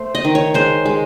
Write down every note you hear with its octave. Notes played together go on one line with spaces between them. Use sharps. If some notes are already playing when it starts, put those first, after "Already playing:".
Already playing: A3 C5
D#5
D#3
C#5
G#3 C5
G#3